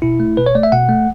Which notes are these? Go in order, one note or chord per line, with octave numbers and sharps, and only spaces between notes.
B2 E4
A3
B2 B4
C#5
A3 D5
E5
B2 F#5
A3